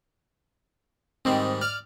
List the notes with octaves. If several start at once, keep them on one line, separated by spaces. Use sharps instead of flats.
G#2 D#3 G3 C4
D5 F6